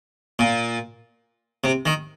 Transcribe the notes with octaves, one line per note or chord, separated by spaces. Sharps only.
A#2
C3
D#3